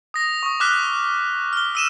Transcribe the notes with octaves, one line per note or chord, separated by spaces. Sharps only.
D#6 A#6
C#6 D#6
D6 D#6 F6 F#6 A#6 B6
F6 G7
E6 D#7 E7